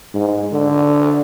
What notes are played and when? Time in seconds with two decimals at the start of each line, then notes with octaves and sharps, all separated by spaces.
0.14 G#2
0.52 D3